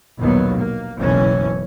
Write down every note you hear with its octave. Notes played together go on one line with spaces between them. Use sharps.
A#1 D#2 B2 F#3 B3
A#3
F#1 B1 F#2 E3 C#4